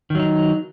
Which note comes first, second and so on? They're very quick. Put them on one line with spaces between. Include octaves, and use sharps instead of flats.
D#3 F#3 D#4